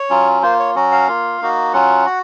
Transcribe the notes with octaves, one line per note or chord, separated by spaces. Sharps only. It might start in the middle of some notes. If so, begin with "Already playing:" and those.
Already playing: C#5
F#3 C#4 F4
A#3 F4 C5
C#5
F#3 C#4 F#4
F5
A#3 F4
A#3 D#4 F#4
F#3 C#4 F4 F#5
F#4